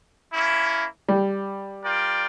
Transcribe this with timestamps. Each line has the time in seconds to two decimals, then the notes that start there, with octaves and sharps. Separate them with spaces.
0.33 A#3 C#4 E4
1.09 G3
1.83 F4 A#4 D5 G5